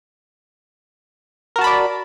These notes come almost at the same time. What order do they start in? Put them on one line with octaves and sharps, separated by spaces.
A#4 F#4 A5 B5 D5